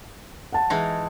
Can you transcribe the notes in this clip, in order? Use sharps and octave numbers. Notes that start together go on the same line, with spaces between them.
F#5 A5
E3 G#3 D#4